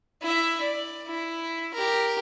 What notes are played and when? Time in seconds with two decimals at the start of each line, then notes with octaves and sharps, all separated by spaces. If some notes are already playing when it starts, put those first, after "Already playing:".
0.22 E4 E5
0.61 D5
1.06 E4
1.74 G4 A#4